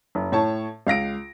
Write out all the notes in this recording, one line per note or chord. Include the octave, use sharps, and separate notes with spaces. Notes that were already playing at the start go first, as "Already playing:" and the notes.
F#1
A2 C#5 A5
C#2 F5 A#6 D7